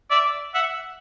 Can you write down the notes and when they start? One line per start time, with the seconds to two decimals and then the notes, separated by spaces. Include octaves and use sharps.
0.11 D5 E5
0.55 E5 F#5